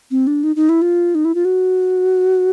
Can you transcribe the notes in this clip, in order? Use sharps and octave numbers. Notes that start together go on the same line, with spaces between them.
C4
D4
D#4
D#4
E4
F4
D#4
E4
F4
F#4